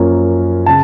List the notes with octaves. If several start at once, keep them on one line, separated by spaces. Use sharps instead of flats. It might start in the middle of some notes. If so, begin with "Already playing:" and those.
Already playing: F#2 F3 A#3 C#4
C#3 A5